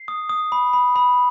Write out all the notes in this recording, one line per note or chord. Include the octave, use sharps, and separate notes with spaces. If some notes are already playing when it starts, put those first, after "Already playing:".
Already playing: C7
D#6
D#6
B5
B5
B5